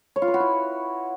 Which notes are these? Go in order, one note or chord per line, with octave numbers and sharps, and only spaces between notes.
C#5
F4
B4
F#4
E4